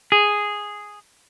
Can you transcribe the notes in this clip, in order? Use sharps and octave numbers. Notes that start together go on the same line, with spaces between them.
G#4